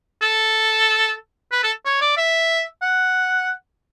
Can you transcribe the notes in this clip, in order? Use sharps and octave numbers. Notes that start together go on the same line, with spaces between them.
A4
B4
A4
C#5
D5
E5
F#5